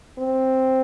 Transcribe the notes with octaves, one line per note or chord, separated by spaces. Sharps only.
C4